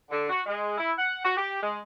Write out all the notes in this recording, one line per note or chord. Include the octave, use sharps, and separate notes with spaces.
D3
F#4
G#3
E4
F#5
F#4
G4
G#3